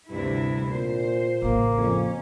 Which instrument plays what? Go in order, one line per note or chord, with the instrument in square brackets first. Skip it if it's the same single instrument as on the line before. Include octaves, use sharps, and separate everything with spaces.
[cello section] D2 C3 E4 [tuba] G2
[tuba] A#2 [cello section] C5
[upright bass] A1 C#3 [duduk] A#3
[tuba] F2 [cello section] C#4